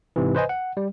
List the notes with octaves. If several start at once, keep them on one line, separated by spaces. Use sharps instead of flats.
G#2 C3 E3
B4 C5 D#5 G#5
F#5
G3